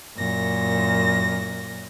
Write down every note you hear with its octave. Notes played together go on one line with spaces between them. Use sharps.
F#2 A#2 A#6